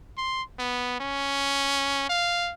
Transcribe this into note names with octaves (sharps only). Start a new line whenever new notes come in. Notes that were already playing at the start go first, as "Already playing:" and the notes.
C6
B3
C#4
F5